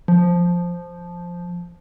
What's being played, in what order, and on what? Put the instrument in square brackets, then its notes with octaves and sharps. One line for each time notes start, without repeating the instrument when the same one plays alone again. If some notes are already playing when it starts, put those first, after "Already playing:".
[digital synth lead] F3